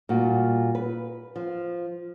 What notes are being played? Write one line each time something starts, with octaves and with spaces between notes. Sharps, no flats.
A#2 G3 F#4
B4
F3